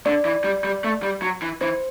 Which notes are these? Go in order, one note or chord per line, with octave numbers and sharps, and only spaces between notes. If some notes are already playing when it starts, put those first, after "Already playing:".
D3 D5
E3
G3
G3
A3
G3
F#3
E3
E3 C5